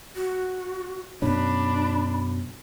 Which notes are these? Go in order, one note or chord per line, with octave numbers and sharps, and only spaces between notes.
F#4
F#2 B2 C#4 D4 B5